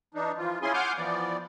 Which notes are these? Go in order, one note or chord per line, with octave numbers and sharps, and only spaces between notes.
E3 D4 D#4
E3 F3 F4
C#4 E4 F4 G#4 G#5 C6
F#5 G#5 C6 D6 F6 G6
E3 F3 B3 D5